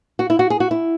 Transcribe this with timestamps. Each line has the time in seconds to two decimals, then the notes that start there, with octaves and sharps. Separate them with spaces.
0.19 F#4
0.30 E4
0.39 F#4
0.50 G#4
0.60 F#4
0.71 E4